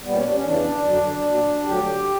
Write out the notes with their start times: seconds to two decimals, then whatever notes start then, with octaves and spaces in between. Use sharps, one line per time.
0.04 A#2 G3 B3
0.14 C#4
0.24 D4
0.34 C#4
0.44 E2 C#3 E3 D4
0.84 F#2 D3 F#3
1.25 A#2 F#3
1.65 D2 D3 F#3 G4